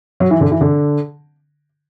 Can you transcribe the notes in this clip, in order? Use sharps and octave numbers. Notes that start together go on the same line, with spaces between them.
F#3
E3
D3
E3
D3